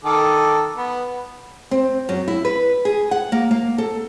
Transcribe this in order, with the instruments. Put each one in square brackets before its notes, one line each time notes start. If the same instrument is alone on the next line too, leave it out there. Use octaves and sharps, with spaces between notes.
[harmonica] D#3 A4 D6
B3
[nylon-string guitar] C4
F#2
E4
B4
G#4
F#5
A#3
A#3
A4